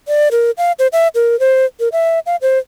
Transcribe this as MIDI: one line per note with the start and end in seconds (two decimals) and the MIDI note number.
0.08 0.28 74
0.31 0.51 70
0.58 0.72 77
0.79 0.87 72
0.93 1.08 76
1.15 1.39 70
1.40 1.65 72
1.80 1.88 70
1.92 2.19 76
2.26 2.36 77
2.42 2.58 72